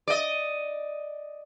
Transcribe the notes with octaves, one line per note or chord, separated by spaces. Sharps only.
D5 D#5